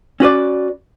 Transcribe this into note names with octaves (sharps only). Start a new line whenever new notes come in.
C#4 F#4 B4 D5